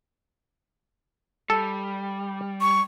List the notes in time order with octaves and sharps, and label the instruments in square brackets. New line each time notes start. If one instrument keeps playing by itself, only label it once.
[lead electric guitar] G3 [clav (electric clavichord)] A4
[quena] C#6